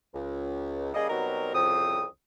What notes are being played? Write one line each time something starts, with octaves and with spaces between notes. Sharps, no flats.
C#2
C#3 G3 A#3 G#4 D#5
B2 F#3 G3 C4 D#4 A#4
C2 F2 C#3 F3 C4 D#6